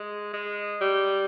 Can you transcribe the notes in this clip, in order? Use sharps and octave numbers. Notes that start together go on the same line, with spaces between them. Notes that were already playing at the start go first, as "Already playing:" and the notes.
Already playing: G#3
G#3
G3